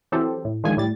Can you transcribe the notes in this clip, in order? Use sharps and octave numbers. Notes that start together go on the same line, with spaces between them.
E3 F#3 C4 G4 A4 C5
A2
D3 D#3 F3 G#3 G#5
A2 G3 A6